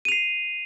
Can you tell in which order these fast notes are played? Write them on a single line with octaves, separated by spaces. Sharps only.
D#7 F7 C7